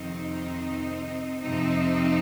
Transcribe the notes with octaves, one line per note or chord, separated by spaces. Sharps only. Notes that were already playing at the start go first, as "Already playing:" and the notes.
Already playing: F2 C3 D#3 C4 D#4
F2 C3 F3 C4 D#4